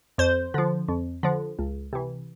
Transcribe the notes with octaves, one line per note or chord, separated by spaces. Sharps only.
F2 C5
D3 F3
F2
D3 F3
C#2
C3 E3